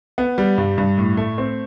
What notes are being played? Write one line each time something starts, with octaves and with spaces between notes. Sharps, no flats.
B3
G3
G2
G2
A2
A3
C4